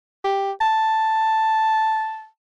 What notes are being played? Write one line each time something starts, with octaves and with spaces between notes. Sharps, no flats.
G4
A5